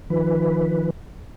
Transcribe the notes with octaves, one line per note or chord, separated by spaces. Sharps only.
D#3 F3 B4